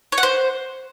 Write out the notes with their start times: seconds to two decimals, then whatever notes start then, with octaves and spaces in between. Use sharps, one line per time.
0.12 C#5
0.18 F#5
0.23 C5